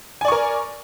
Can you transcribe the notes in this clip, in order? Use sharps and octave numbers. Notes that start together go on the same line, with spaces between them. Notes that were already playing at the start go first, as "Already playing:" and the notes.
A#4 D5 G#5 C#6